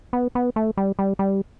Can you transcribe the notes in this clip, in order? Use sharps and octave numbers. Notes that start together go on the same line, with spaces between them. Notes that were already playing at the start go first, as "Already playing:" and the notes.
B3
B3
A3
G3
G3
G3